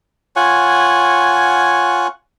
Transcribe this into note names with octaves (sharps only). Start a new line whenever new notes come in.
F4 C#5 F#5 G#5